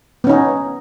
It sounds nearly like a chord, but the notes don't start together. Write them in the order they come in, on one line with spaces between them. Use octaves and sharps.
B3 C#4 D#4